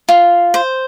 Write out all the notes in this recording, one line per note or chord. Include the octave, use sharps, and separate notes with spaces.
F4
C5